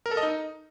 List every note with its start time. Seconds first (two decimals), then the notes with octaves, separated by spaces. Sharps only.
0.06 A#4
0.11 A4
0.17 D#5
0.23 D#4